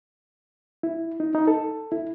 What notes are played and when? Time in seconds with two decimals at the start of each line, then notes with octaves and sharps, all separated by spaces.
0.83 E4
1.20 D#4
1.35 D#4
1.47 A4
1.92 E4